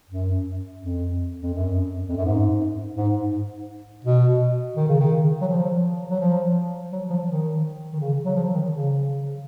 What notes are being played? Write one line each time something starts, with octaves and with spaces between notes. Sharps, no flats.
F#2
F2
F2
F#2
F2
F#2
G#2
G#2
B2
D#3
C#3
D#3
F#3
F3
F#3
F3
F#3
F3
D#3
D#3
C#3
F#3
F3
D#3
C#3